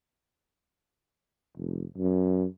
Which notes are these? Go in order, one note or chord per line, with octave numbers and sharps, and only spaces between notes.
F1
F#2